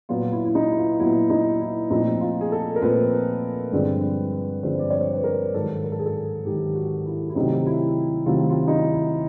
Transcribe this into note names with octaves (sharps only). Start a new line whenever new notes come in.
A#2 F#3 B3 F4
E4
E4
D#4
E4
F4
A#2 F#3 B3 E4
D#4
E4
A#2 F3 A3 C4 D#4
F4
G#4
A4
A#4
A#2 F3 A3 C4 B4
G2 D3 F3 G#3 C4
G2 D3 F3 G#3 C4 C5
D5
C#5
C5
B4
A#4
G#2 D#3 F#3 A4
A#4
A4
G#4
A4
G#4
G#2 D#3 F#3 G4
F#4
E4
E4
C3 D#3 F#3 A3 C4 D#4
E4
C3 D#3 F#3 A3 C4 F4
F4
D#4
E4
E4